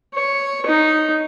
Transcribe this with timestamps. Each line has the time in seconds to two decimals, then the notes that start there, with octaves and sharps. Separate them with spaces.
0.15 C#5
0.66 D#4